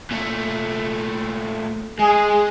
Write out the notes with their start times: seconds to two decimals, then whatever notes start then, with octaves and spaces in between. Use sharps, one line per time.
0.11 A#2 A3
1.99 G#3 G#4